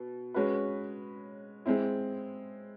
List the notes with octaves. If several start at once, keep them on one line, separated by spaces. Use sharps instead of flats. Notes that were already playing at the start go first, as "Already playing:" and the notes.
Already playing: B2
G#3 C#4 F#4 B4
G#3 C4 E4